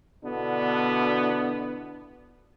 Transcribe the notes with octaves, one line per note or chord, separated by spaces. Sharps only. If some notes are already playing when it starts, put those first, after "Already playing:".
B2 D3 B3 D4 E4